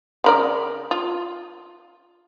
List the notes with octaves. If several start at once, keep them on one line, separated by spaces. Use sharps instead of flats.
C#3 A#4 D5
F4